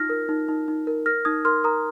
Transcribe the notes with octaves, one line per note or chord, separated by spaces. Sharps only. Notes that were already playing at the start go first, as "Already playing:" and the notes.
Already playing: D#4 F4 F6 A#6
A#4
D#4
D#4
D#4
A#4
A#4 F6 A#6
D#4 D#6 G#6
A#4 C6 F6
A#4 A#5 D#6